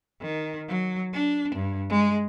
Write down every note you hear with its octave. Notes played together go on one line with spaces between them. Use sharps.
D#3
F#3
D4
G2
G#3